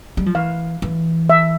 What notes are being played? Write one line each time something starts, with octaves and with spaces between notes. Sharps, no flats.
G3
F3
E3 F5
E3
E5